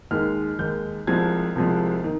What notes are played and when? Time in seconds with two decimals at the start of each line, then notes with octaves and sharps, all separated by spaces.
0.11 D#2 D#3 G#3 F6
0.59 D#2 D#3 G#3 G6
1.07 C2 C3 F3 G#3 G#6
1.56 C2 C3 F3 G#3
2.04 D#3